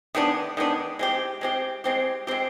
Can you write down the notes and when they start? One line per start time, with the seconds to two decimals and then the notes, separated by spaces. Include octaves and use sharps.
0.15 D#3 G#3 B3 D4
0.57 D#3 G#3 B3 D4
0.99 G#3 C4 G4
1.41 G#3 C4 G4
1.84 G#3 C4 G4
2.27 G#3 C4 G4